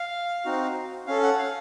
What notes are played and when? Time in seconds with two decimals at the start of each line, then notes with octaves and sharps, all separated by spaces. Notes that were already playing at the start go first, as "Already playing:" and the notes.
Already playing: F5
0.45 C4 D#4 F#4
1.07 C#4 A4 F5
1.23 F#5
1.38 F5